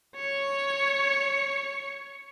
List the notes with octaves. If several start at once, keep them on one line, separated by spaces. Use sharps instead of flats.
C#5 C#7